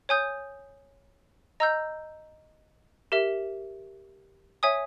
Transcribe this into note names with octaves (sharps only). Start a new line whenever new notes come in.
C#5 G#5 D#6 G6
D#5 A#5 E6 G6
G4 A#4 E5
C#5 E5 G#5 D#6